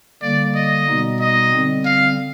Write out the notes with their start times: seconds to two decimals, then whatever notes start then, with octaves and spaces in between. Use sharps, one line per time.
0.22 D3 G3 A#3 D5
0.56 D#5
0.87 B2 G3 B3 D#4
1.20 D#5
1.52 D3 G3 C4
1.85 F5